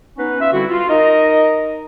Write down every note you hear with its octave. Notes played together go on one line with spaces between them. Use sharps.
B3 C#4 D#4 B4
F4 E5
D3 G3 C4 E4 F#4
F4
D#4 A#4 D#5